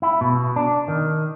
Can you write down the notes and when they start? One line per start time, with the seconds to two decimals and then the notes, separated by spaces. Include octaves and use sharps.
0.02 E4
0.21 B2
0.56 D4
0.88 D#3